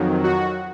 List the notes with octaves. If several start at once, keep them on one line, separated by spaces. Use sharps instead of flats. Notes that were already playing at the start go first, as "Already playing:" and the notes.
Already playing: F2 D#3 F#3
F#4